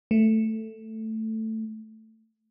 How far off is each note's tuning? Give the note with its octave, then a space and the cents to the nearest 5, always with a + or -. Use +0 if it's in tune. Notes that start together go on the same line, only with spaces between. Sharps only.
A3 +5